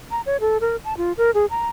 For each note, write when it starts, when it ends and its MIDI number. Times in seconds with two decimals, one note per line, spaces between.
0.11 0.21 82
0.26 0.37 73
0.40 0.58 69
0.61 0.76 70
0.84 0.97 81
0.97 1.12 65
1.17 1.31 70
1.34 1.46 68
1.50 1.68 82